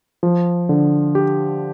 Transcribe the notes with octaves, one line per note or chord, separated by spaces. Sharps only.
F3
D3
G4